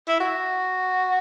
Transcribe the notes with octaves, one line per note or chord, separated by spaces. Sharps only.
E4
F#4